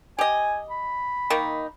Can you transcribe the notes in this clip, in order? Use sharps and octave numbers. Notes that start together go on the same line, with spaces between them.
G4 D#5 G#5
B5
D#3 A#3 D#4